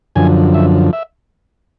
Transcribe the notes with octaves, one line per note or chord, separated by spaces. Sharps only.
F#2 D3 F3 G#5
E5
E5